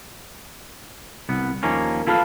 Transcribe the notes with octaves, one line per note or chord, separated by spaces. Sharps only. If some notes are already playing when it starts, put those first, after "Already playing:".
C2 B3
D#2 D#3 F3 A#3 C#4
E4 F4 A4 B4 C#5 F5